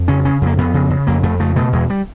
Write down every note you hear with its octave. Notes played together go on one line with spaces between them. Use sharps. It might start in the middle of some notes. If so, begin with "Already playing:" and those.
Already playing: F2
C#3 C#4
C#3 C#4
F2
A#3
F2 B3
C#3
C#3
F2 A#3
F2 A3
C#3 A3
B2 A3
E2 G#3
G3